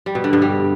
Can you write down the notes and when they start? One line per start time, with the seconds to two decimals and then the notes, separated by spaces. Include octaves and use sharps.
0.06 G3
0.15 B2
0.24 D3
0.33 G2
0.42 G3